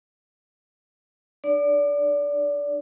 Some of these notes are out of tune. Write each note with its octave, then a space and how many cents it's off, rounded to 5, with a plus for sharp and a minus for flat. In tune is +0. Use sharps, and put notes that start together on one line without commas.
D4 +35 D5 -25